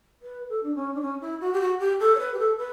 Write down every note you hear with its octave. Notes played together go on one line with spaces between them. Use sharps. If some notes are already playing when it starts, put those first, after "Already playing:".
B4
A4
D4
C#4
D4
C#4
E4
F#4
G4
F#4
G4
A4
C#5
B4
G4
A4
B4